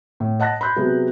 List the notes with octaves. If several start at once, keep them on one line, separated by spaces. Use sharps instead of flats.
A2
D#5 F#5 A5 F#6 A#6
B5 C6 F#6 G6
C3 F#3 B3 G#4